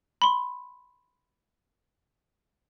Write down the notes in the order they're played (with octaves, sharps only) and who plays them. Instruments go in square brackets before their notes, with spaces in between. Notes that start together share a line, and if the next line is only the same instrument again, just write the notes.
[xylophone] B5 C6